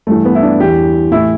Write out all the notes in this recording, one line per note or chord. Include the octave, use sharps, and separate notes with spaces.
G2 E3 A3
B3
E4
D4
E2 E3 G4
A2 E3 E4